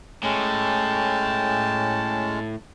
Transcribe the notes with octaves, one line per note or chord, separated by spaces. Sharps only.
A2 G#3 C#4 G5 A5